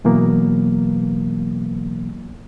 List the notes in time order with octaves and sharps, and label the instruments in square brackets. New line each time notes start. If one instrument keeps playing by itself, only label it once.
[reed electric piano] B2 E3 F#3 A#3 B3